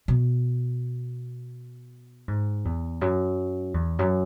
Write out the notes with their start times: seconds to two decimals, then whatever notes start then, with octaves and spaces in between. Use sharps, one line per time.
0.08 B2
2.28 G#2
2.65 E2
3.01 F#2
3.74 E2
3.99 F#2